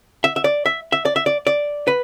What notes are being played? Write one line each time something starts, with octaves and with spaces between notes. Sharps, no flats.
E5
E5
D5
E5
E5
D5
E5
D5
D5
B4